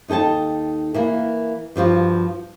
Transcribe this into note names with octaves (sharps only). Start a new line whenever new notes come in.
D#2 D#4 A4 G5 A5
E3 A#3 A#4
G2 F3 F4 F#4